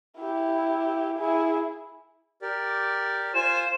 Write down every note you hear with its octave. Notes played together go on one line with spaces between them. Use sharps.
E4 G4
E4 G#4
G4 A#4 D5
F4 C5 G#5 E7